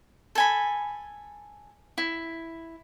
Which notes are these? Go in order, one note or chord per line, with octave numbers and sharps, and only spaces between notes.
A4 G#5 B5
E4